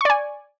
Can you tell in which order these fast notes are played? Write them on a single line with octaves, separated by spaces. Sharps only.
C#6 D5 G#5